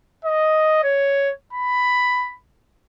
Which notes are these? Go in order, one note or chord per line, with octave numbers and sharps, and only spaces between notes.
D#5
C#5
B5